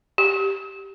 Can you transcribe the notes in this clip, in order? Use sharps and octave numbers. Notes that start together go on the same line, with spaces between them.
G4